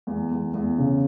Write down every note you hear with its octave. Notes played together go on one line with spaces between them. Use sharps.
E2
E2
E2
C#3